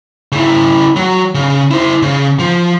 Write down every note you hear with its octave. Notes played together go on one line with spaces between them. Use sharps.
C#3 E4
F#3
C#3
E4 C5
C#3
F3